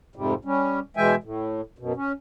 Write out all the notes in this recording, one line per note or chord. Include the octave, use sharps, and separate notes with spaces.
F2 G#2 C3 G3
G3 C#4
B2 E3 G#3 E5 G5 G#5
A2
F#2 B2
C#4